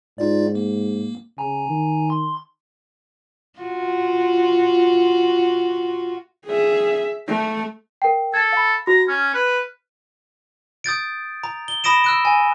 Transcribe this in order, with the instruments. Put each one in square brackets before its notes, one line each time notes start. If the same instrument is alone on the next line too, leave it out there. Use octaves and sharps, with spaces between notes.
[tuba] G#2 [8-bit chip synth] D#4 F4 D5
[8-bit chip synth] A#3
[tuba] C#3 [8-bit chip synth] G#5 A#5
[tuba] D#3
[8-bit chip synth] C6
[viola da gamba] F4 F#4
[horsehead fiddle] G#4 E5
A3
[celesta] A#4 G5
[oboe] A4 [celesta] G#6 A6
[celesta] F5 B5
[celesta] F#4 [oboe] A#5
[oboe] C#4 [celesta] F6
[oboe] B4
[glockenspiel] D#6 G6 A6 D7
A#5
G7
B5 D#6 A#6 D7 E7
E6 F#6 D7
G#5